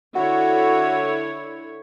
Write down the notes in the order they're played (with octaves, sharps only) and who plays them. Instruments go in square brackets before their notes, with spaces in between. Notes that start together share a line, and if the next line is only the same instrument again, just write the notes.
[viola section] D3 E4 C#5 [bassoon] F#4